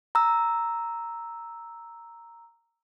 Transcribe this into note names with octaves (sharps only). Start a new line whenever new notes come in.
A#5 E6